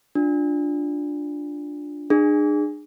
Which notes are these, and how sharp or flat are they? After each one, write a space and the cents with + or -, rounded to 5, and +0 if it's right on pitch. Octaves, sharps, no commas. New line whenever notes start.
D4 +0 F4 +15
D4 +40 G#4 -10